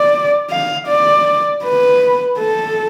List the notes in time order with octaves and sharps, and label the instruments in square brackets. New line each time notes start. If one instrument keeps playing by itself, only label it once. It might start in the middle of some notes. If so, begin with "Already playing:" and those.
Already playing: [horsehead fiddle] D5
F5
D5
B4
A4